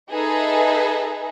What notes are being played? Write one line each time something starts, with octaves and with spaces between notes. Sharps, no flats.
D#4 G#4 A4 B4 E5